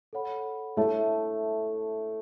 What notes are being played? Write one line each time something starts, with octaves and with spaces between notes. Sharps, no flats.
A4 C#5 F#5 B5
A3 E4 A4 C#5 E5 A5